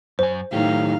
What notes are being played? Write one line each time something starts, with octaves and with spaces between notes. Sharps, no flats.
F#2 C5 G#5
A2 D#3 F#3 D#4 G4 F5